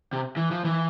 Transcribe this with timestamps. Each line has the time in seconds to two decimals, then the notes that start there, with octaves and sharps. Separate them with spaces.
0.13 C3
0.36 E3
0.51 F3
0.64 E3